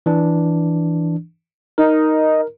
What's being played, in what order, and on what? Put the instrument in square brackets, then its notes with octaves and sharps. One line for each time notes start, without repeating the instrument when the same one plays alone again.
[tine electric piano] E3 D4
[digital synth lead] D#4 [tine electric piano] A#4